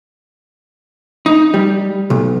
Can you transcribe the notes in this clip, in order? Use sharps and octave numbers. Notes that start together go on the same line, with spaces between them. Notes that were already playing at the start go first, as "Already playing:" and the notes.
D#4
G3
B1